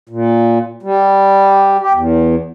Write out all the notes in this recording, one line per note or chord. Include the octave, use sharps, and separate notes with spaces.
A#2
G3
G4
E2